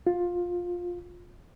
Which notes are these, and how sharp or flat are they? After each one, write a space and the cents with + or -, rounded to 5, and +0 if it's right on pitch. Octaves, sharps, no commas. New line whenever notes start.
F4 +15